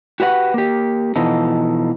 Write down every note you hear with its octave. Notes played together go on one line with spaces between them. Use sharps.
F#4 G4 B4 F#5
A#3 G4
B2 E3 F3 D#4 A4